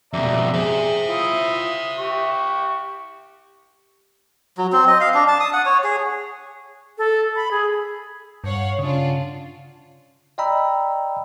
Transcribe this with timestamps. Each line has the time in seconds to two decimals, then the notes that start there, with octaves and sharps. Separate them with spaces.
0.13 F2 B2 D5 E5 A#5
0.54 G#4 C5 E5
1.08 E4 F4 D#6
1.98 G4 C#6
4.58 F#3
4.73 C4
4.87 D#5
5.00 F5
5.14 D4
5.28 A5
5.40 D#6
5.53 F#5
5.66 C#5
5.84 G#4
6.98 A4
7.36 B5
7.51 G#4
8.44 G2 C#5 F5 F#5
8.79 C#3 C#4 D4 F4
10.38 D5 D#5 G5 A#5 B5 E6